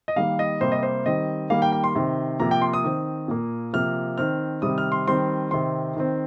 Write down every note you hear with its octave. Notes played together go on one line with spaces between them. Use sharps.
D#5
D#3 G3 A#3 F5
D#5
C3 G3 A#3 C5
D#5
C5
D#3 G3 C4 D#5
D#3 G3 A#3 F5
G5
G5
C6
C3 D#3 C4
C3 F3 A#3 A#5
G5
C6
D#6
D#3 C4
A#2 A#3
C3 F3 A#3 F6
D#3 C4 F6
C3 D#3 G3 C4 D#6
F6
C6
D#3 G3 C4 C6
C3 D#3 C4 C6
D#3 C4